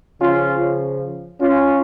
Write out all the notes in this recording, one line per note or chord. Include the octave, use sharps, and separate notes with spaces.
C#3 F3 C#4 F4
C#4 F4